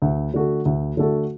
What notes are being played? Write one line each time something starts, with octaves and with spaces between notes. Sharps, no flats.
D2
D3 A3 F#4 A4
D2
D3 A3 F#4 A4